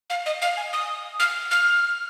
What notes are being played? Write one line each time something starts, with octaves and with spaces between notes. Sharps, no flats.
F5
D#5
F5
G#5
D#6
F6
F6